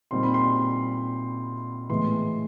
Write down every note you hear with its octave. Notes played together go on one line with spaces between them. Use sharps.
A#2 G3 C4 D#4 C6
B5
C6
A2 E3 G#3 B3 C6